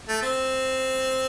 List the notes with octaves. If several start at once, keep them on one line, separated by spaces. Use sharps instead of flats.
A3
C4